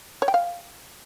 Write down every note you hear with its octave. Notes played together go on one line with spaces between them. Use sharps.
C#5
G5
F5